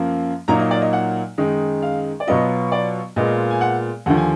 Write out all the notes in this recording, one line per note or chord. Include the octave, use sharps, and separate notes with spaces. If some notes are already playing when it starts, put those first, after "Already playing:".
Already playing: F#2 F3 A#3
A#2 F#3 A#3 D#4 A#5
D#5
D5
D#5
F#5
F#2 D#3 G#3 D#4
F5
D5
B2 F#3 B3 F4 D#5
D5
A#2 G#3 B3 F4 D#5
G#5
F#5
D#2 D3 F3 F#5
G#5